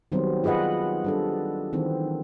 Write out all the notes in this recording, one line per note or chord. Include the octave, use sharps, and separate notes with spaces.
D#3 F#3 G3 B3 C4 C5
F4 G#4 B4 D#5 F#5
G3 D4 A4
D#3 E3 C4